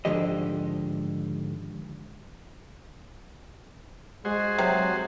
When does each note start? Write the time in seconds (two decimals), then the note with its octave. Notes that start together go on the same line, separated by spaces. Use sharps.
0.05 G#2 D3 D#3 F3 G4 D#5
4.25 G#3 F#4 G#4 C5
4.59 C3 F#3